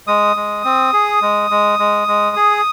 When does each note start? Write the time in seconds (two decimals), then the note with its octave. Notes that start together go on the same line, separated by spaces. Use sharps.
0.07 G#3 D#6
0.36 G#3
0.64 C4
0.93 G#4
1.22 G#3
1.50 G#3
1.79 G#3
2.08 G#3
2.36 G#4